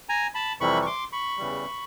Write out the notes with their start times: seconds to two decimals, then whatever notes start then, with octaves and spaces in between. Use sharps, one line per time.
0.09 G#5 A#5
0.34 A5 B5
0.60 F2 C3 E3 G3 B5 C#6
0.82 C#6
0.86 C6 D6
1.12 B5 C#6
1.38 E2 C#3 E3 G3